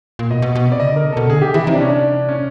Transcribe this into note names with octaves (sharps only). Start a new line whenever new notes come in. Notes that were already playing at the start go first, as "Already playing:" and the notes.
A#2
B2 D#5
B2
B2
C3 D5
C#3 D#5
D3 A#4
C3
B2 A4
D3 G#4
D#3 G4
E3 E4
C3 D#4
D4
C#4
D4
C#4